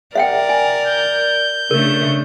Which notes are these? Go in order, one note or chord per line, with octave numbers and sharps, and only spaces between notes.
A#4 D5 E5 F#5 G5
G#5
G6
C#3 A3 D4 A#4